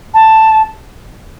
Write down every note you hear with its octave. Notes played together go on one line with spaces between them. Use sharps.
A5